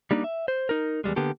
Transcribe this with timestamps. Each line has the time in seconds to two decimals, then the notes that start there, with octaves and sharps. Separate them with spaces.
0.11 G3 A#3 D4 D#4
0.24 E5
0.48 C5
0.69 D#4 A#4
1.04 E2 G#2 G3 G#3
1.16 D3 A#3 B3 G4 A4